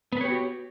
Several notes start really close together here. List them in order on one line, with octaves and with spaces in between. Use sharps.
B3 B4 C#5 G4 F#4